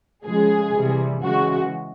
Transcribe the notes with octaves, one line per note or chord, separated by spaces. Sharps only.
C#3 F3 G#3 G#4
C3 E3 G3
C#3 E3 G#3 F#4